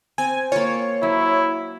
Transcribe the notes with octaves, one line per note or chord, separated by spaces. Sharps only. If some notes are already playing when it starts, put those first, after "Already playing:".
C4 G#5
A#3 F4 C#5
F#3 E4